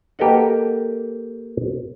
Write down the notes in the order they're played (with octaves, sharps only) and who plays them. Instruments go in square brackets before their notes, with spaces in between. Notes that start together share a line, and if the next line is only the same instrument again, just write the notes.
[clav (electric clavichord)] A#3 G4 A4 B4 D#5 F#5